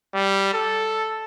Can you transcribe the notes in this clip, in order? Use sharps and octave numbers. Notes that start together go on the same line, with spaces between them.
G3
A4